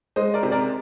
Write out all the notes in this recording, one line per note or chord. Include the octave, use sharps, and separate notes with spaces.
G#3 C5 D#5
A#4 D5
C3
A#4 D5